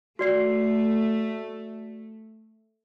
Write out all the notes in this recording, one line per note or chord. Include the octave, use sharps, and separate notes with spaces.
A3 F#4 D5 C7